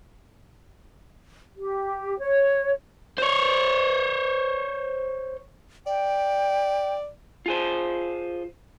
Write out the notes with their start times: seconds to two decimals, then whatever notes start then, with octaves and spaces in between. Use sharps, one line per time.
1.57 G4
2.19 C#5
3.18 C5 C#5
5.87 D5 G5
7.46 F4 G#4 C5